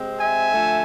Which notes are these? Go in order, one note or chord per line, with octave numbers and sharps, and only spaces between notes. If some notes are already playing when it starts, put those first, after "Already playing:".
Already playing: C3 G#3 C4
E5 G#5
D3 F3 A3